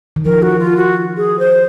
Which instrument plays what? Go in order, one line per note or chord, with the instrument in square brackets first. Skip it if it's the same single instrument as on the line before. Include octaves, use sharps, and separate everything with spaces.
[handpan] D#3
[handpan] F3 [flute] A#4
[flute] F#4
F4
F#4
G#4
C5